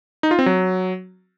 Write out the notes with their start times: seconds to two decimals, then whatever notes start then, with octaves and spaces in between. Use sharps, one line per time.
0.23 D#4
0.31 F4
0.39 C4
0.46 F#3